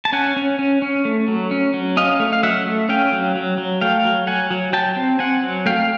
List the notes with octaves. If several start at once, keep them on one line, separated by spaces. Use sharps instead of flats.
A5
C#4 F#5 G#5
C#4
C#4
C#4
A3
F#3
C#4
F#3
C#4 D#5 F5
A3
F5
F#3 E5 F#5
A3
C#4 F5 G5
F#3
F#3
F#3
A3 F5 G5
F#3
F#3 F#5 G#5
F#3
F#3 G5 A5
C4
C4 F#5 G#5
F#3
A3 F5 G5